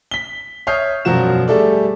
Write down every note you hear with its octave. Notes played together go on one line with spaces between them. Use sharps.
B6 G7
C#5 E5 D#6 F6 G6 C7
E1 F#2 F3 F#3 F#4 E7
G3 A3 G#4 A4 D5